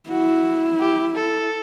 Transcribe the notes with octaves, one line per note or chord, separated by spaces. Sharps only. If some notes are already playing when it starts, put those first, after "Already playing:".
E4 F#4
G4
A4